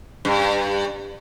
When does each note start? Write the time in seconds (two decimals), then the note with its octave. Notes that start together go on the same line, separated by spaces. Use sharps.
0.25 G2